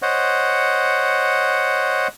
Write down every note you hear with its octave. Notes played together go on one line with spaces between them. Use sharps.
C5 C#5 D#5 F#5